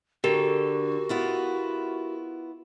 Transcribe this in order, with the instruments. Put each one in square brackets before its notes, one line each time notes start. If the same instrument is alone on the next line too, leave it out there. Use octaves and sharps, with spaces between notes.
[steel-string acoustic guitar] D3 [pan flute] F#4 [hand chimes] G4 A#4
[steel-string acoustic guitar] B3 E4 F4